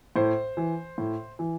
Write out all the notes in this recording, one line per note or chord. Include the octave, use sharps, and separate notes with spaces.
A2 C5
E3
A2
E3